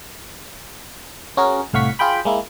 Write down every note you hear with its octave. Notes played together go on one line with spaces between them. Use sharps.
C#4 F#4 G#4 A#4
C2 A2 F5 F#5 C#6 B6
F4 G#4 G5 B5
G#3 A#3 E4